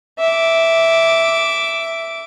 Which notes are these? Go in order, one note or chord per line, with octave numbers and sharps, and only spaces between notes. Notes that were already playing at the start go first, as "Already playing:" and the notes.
E5 D6